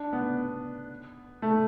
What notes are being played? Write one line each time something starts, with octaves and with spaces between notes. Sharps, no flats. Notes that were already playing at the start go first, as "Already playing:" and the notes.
Already playing: D4
B3
A3